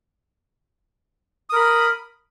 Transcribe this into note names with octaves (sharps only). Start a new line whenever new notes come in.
A#4 B5 D#6